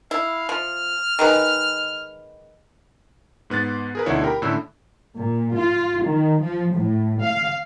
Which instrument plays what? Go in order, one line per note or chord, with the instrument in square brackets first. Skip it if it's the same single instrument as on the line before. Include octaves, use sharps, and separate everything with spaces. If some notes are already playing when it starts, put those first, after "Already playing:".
[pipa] E4 [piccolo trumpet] F5
[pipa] F3 [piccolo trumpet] F6
[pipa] D#3 G#3 B4
[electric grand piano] G#2 B3 F#6 A6
G#4 A#4 B4
D2 B2 D3 D#4 E4 C#5
G4 A#4 G5 A#5 B5
A2 D3 C#4 E4 B5 E6
[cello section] A#2
F4
D#3
F3
A2
F5